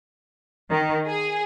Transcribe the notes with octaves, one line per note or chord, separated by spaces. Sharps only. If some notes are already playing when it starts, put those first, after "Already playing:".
D#3
G#4